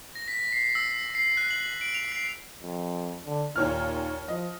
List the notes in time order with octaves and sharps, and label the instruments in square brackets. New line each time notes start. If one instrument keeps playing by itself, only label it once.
[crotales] A#6
B6
C7
E6
C7
F#6
F#7
F#7
D7
F7
C7
[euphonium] F2
D3
[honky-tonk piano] D#2 C#5 F6 [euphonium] A#2
[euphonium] F3 [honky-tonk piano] D#5